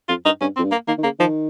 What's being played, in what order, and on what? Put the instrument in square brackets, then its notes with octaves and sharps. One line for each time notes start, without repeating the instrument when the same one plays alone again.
[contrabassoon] F2 [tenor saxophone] F4
[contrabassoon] G2 [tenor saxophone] D#4
[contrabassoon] G2 [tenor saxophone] C#4
[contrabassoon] F2 [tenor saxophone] C4
[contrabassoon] G2
[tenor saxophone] A#3
[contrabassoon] D#3 [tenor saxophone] A#3
[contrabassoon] D#3
[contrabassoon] C#3 [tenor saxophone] A#3
[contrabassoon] D#3 [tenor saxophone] F3